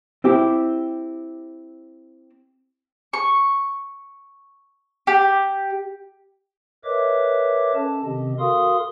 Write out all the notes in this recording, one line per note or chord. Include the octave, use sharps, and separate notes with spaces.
C4 E4 G4
C#6
G4
A#4 B4 C#5 D#5 E5 D6
C#4 A4 A5
C3 D#3 C4 G4 D#5
F#4 A4 A#4 F5 C6 D#6